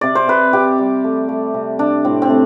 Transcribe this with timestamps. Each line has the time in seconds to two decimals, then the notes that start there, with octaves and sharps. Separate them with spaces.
0.01 C3 D5
0.15 C5
0.28 C3 B4
0.53 C3 G4
0.78 G3
1.04 A3
1.29 A3
1.54 C3
1.79 C3 D4
2.05 A2 C4
2.22 C4
2.30 A3